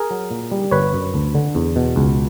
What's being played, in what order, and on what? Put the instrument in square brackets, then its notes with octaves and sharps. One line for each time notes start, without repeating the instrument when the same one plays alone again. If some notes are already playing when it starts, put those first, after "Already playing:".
Already playing: [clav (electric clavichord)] G#4 A#4
F#3
A#2
G3
G1 B4 C#5
F#2
D2
D3
E2
B2
C#2